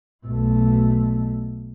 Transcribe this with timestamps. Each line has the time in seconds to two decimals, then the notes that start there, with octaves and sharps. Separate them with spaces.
0.26 B1 A3